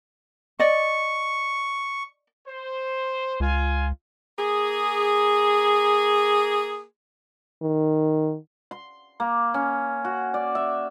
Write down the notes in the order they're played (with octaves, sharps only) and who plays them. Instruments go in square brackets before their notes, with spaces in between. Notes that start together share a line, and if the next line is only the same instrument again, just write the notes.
[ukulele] D5 D#5 [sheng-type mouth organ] C#6
[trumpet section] C5
[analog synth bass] C#2 [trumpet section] F4 G#5
[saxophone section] A#3 G#4
[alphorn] D#3
[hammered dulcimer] C6
A#3
C#4
F#4
D5
E5